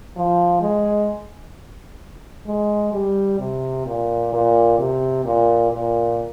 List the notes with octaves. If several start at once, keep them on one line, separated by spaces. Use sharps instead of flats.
F3
G#3
G#3
G3
C3
A#2
A#2
C3
A#2
A#2